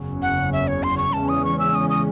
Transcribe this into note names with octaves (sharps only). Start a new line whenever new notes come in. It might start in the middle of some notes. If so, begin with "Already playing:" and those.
Already playing: F#1 E2 C#3 F#3 C#4
F#5
E5
C#5
C6
C#6
E2 C#3 E3 G#3 C#4 A5
D#6
C#6
E6
D#6
D#6